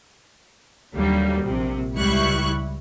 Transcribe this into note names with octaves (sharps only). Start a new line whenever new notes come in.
D#2 D3 F#3 G3 A#3
A#1 C3
C#2 G3 E4 C#6 F#6